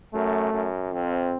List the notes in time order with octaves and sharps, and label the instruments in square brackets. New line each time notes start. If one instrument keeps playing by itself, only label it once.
[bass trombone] F#2 [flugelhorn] A3
[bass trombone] F#2
[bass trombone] F2 [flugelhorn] C4